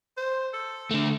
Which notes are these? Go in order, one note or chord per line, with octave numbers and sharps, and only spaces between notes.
C5
A4
D3 A3